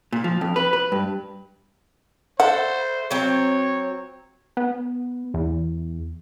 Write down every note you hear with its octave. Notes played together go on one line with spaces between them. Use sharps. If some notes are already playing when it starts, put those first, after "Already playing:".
A#2
F3
F2
B4
B4
G2
A4 C5 E5 F#5
F#3 C4 C#5
B3
E2